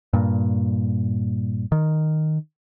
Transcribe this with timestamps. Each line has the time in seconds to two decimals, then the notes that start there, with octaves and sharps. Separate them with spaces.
0.13 G2 A#2
1.72 D#3